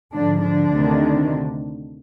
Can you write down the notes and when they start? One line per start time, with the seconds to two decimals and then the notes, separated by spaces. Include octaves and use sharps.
0.13 G#2 D3 F3 D4
0.42 D3 D4
0.73 D2 C3 D#3